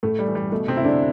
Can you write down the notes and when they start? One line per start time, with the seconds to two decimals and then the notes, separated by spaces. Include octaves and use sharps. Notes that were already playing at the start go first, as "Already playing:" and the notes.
0.03 A2 A3
0.19 G3
0.28 E3
0.35 G3
0.52 B2 A3
0.68 C3 C4
0.77 E4
0.84 D3 D4